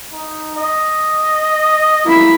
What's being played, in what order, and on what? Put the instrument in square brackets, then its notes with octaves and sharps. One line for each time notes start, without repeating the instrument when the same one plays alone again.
[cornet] D#4
D#5
[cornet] A#3 [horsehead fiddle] E4 B5